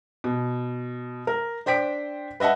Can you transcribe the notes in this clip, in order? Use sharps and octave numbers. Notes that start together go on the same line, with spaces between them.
B2
A#4
D4 C5 G5 B6 D7
B4 D#5 E5 F#5 A5